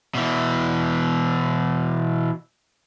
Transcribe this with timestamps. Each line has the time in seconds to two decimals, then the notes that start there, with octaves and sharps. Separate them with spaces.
0.15 B2 E3